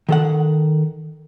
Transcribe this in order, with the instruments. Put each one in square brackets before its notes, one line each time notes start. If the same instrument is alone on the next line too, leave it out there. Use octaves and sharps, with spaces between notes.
[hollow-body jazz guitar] D#3 A4 F#5